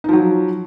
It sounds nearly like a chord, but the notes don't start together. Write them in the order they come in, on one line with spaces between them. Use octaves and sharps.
D#4 F3 F#3